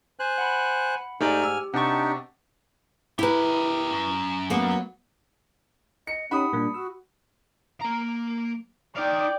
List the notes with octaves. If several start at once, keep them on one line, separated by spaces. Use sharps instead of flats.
C5 G#5 F#6
F#5 B5
G#2 A3 D#4 G4 D5 G#5 F6
E6
C3 D4 D#4 G4 F#5 A5 C#6
E4 G4 A#4 B4
F#2
F#3 A#3 B3
D#5 C#7
C#4 D#4 G4 F#5 B5 D#6
A#2 G3 A#3 D4
F#4 E6
A#3 A#5
D#4 D5 F5 G5